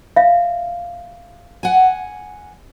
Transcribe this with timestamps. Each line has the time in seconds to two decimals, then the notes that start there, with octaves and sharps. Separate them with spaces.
0.16 E5 F5
1.63 F#5 G#5